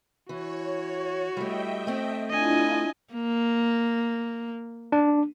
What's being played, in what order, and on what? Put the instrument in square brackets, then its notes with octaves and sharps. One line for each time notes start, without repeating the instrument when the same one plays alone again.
[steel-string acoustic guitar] E3 [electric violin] F#4 [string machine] C#5
[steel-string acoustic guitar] G3 A3 [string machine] D#5 E5 G5
[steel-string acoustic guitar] A3 C4
[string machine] D4 E4 F4 [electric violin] D#5 G#5
[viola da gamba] A#3
[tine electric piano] D4